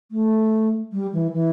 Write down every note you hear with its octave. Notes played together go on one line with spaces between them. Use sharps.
A3
G3
E3
E3